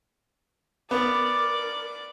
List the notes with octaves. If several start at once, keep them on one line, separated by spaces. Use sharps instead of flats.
B3 A#4 D5 D6